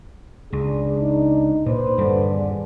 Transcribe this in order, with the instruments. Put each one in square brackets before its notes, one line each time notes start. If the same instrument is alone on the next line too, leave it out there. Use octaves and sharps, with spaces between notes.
[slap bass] C#2 [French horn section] D4 [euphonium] G#4
[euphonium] D#4
[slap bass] A#2 [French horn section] B4 C5
[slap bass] D#1 G2 G3 [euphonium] D3
[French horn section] G#4 D5